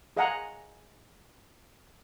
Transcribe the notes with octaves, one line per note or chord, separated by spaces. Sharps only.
G#4 D#5 F5 F#5 G#5 A#5